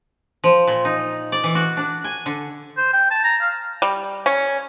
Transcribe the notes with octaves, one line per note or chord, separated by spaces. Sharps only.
F3
A#2
D#4
D5
E3
F#4
D4
G#5
D3
C5
G5
A5
A#5
F5
G3
C#4